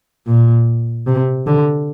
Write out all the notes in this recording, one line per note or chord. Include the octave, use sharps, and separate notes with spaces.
A#2
C3
D3